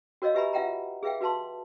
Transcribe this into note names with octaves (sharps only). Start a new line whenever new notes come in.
F#4 A#4 C#5 D#5 F5
G4 B4 E5 G#5 A#5 B5
F4 B4 E5 F#5 G5 A#5
G#4 B4 E5 F5 G5
F#4 B4 F5 A5 C6